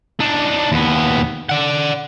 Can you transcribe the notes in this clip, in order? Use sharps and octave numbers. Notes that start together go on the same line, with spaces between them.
D4 D#4
D#2 B3
D5 F#5